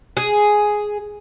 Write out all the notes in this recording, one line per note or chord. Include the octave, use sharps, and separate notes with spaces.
G#4